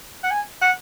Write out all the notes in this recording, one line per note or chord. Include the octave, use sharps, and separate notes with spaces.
F#5
G#5
F#5